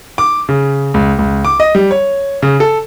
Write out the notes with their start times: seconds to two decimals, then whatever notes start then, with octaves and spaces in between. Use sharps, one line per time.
0.18 D6
0.49 C#3
0.94 C#2
1.19 C#2
1.45 D6
1.60 D#5
1.75 G3
1.91 C#5
2.42 C#3
2.60 A4